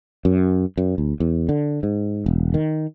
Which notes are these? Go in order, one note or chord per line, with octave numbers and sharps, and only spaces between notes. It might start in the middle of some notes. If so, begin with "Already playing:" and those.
F#2
F#2
D2
E2
D3
G#2
E1
D#3